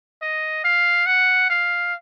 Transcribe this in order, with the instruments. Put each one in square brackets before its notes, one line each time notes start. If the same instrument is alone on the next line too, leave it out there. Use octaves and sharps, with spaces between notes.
[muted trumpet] D#5
F5
F#5
F5